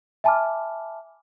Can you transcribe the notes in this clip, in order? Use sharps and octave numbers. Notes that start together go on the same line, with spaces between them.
E5 G#5 A5 B5 D6 F6